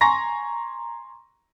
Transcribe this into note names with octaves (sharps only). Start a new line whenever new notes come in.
G#5 A#5 C6 C#6 A#6